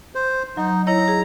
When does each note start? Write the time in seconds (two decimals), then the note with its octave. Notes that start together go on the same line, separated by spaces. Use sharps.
0.15 C5
0.57 F#3 D#4
0.87 E4 C#5 D#5 A#5
1.08 G#4